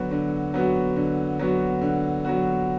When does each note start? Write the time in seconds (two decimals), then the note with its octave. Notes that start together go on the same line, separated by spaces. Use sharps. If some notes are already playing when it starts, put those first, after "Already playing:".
Already playing: D3 F#3 B3 F#4
0.11 D3
0.54 F#3 B3 F#4
0.96 D3
1.39 F#3 B3 F#4
1.81 D3
2.25 F#3 B3 F#4